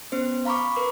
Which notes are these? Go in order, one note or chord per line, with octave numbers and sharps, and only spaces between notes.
B3 C#4 C5
F5 A#5 B5 C#6 D6
A#4 B4